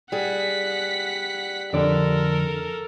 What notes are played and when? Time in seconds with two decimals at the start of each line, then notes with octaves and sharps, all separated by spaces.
0.12 G3 G#4 F#5 B6
1.73 F2 D3 A4 A#4 D5